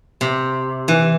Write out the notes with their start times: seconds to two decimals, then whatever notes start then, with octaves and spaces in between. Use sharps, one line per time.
0.21 C3
0.88 E3